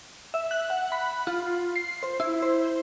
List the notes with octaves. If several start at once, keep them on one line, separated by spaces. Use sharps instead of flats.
E5
F#6
F#5
B5
F4
C7
C5
E4
C5